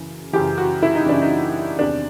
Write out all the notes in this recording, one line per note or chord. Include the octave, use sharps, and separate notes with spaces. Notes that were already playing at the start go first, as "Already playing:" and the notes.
Already playing: F#2 C#3 E3
F#2 C#3 E3 G4
F#4
E4
D#4
F#2 C#3 E3 D4
D#4
E2 C3 D#3 D4